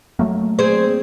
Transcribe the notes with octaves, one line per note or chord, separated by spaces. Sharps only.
F#3 A3 A#3
C4 G#4 C5